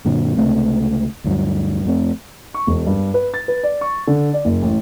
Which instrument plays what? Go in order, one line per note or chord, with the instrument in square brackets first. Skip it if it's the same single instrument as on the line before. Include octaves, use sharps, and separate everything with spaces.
[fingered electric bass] F#2 A#2 D3
C#2 C3 A3 C4
D2 G2 F#3
F2 A3 C4
[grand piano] C#6
E1
G2
B4
A6
B4
D5
C#6
D3
D5
F#1
A1